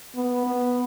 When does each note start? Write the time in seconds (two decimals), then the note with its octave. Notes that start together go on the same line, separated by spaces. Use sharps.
0.15 B3
0.47 B3